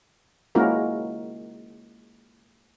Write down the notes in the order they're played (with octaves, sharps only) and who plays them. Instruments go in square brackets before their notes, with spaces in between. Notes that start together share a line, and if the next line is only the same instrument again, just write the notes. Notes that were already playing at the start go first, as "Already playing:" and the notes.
[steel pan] G#3 A#3 C#4 E4 F#4 A#4